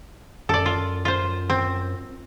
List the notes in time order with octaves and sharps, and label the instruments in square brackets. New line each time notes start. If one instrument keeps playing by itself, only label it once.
[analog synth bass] F#2 [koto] A4 D5
[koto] F4
F4 C5
C4